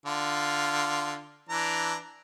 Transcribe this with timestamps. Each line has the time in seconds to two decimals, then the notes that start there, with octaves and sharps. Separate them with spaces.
0.06 D3 F4
1.49 E3 D4 A#5